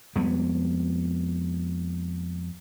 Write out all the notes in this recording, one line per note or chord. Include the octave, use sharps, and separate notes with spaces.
F2 G3 G#3 B3